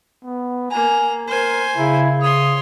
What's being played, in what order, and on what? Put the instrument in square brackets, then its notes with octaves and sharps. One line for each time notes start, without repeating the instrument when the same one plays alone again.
[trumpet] B3
[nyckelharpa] A#3 A#5 [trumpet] G#5
[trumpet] A#4 [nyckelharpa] C5 G#5
[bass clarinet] C#3 [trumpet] E4
[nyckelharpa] C#5 C6 [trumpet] D#6